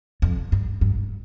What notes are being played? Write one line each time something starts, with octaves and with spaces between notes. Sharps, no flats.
F2
G2
G2